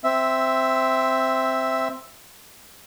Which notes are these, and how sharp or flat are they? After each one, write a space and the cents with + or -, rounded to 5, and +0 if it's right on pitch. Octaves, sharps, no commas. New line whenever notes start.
C4 +0 E5 +0